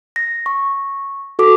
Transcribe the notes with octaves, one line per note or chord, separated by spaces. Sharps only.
A#6
C#6
F#4 A4 D6